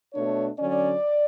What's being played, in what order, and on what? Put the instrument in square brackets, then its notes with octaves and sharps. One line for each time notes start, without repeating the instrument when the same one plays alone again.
[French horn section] B2 A3 D4 C#5
D3 F#3 C#4 D5